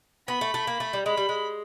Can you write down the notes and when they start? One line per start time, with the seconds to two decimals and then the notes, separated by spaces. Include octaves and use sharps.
0.28 B3 B5
0.41 A3
0.54 A3
0.67 A#3
0.80 A3
0.93 G3
1.06 G#3 B5
1.17 G3
1.29 G#3